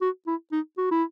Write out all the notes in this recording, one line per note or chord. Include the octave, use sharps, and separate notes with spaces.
F#4
E4
D#4
F#4
E4